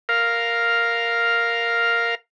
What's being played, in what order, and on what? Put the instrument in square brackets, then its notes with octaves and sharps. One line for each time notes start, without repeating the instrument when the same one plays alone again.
[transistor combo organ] A#4 F5